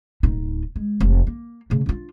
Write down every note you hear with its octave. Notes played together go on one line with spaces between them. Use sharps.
D1 D#4
G#3
F1
A#3
C#3 A3
D4 F4